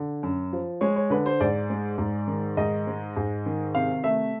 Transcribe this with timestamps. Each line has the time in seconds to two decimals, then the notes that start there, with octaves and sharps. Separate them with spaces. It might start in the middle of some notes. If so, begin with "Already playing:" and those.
Already playing: D3
0.23 F#2
0.53 F3
0.81 G#3 C#5
0.96 C#5
1.10 D3 B4
1.26 C5
1.40 G#2 D5
1.70 G#3
1.98 G#2
2.28 D#3
2.57 G#2 D#5
2.87 G#3
3.17 G#2
3.46 D#3
3.75 C3 F5
4.04 A3 E5